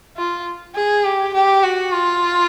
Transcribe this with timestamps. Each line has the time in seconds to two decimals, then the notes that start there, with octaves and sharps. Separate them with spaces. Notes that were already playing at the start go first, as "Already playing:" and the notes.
0.17 F4
0.75 G#4
1.04 G4
1.34 G4
1.63 F#4
1.92 F4